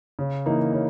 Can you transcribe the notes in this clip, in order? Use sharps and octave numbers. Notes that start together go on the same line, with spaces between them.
C#3
E3 A#3 D#4
C#3